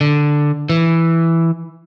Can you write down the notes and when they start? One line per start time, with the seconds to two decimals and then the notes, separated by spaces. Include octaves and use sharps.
0.01 D3
0.69 E3